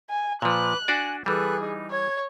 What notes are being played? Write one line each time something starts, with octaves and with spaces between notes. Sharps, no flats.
G#5
A#2 F3 B4 D6 F#6
D4 F#4 D5 G#5
E3 G3 G#4 A4 B4 F#6
D#4
C#5 G#6